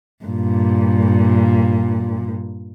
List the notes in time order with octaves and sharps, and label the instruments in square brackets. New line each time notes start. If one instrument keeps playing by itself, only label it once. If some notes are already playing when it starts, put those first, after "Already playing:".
[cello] G2 A#2